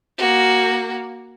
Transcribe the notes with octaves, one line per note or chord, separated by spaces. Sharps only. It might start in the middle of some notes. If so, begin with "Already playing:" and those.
A#3 F#4